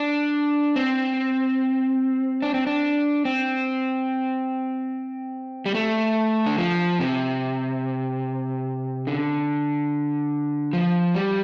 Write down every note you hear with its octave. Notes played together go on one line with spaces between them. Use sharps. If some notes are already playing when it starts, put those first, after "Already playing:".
Already playing: D4
C4
D4
C4
D4
C4
G3
A3
D3
F3
C3
D3
F3
G3